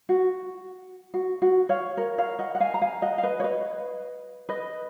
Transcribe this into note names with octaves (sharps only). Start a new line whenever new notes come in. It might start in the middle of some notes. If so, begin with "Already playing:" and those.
F#4
F#4
F#4
C#5 F5
A#4 C#5
C#5 F5
D#5 F#5
F#5
F5 G#5
A#5
F5 G#5
D#5 F#5
F5
B4 D#5
C#5
B4 D#5
B4 D#5